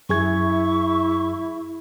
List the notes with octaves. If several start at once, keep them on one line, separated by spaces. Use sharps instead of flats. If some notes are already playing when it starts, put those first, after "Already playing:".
F#2 E4 G#4 E5 C#6 G#6